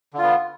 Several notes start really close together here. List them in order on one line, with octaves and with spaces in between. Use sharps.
D3 F4 B3